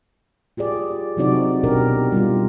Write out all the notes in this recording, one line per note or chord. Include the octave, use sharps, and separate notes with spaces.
F4 G4 G#4 D5
C3 F#3 C4 D#4 F#4 D5
B2 D4 G4 A#4
G3 F4 G4